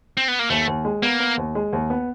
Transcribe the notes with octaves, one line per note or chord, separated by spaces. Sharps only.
C4
B3
A#3
D#2 A3
D#2
G#3
A#3 B3
B3
D#2
G#3
D#2
B3